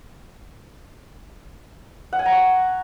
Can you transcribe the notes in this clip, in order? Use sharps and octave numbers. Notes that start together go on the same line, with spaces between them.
F#5
G#5
A#5
C#6